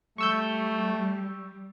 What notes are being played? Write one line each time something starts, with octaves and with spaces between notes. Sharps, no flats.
G3 A3 C#6 E6 G6